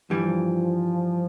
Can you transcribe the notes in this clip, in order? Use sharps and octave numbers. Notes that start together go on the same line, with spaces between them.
G2 E3 F3 G3